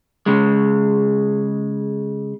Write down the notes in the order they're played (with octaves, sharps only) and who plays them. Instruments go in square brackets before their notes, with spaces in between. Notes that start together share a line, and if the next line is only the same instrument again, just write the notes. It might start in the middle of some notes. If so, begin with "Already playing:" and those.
[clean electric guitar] C#3 G#3